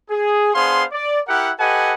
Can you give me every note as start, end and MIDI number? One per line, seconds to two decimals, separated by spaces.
0.10 0.51 68
0.54 0.84 59
0.54 0.84 62
0.54 0.84 68
0.54 0.84 72
0.54 0.84 77
0.54 0.84 84
0.92 1.19 74
1.27 1.50 64
1.27 1.50 67
1.27 1.50 70
1.27 1.50 78
1.59 1.94 67
1.59 1.94 69
1.59 1.94 71
1.59 1.94 75
1.59 1.94 78
1.59 1.94 80